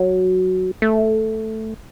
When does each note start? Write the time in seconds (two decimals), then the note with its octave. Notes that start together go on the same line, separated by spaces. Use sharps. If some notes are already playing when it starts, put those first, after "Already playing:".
Already playing: F#3
0.82 A3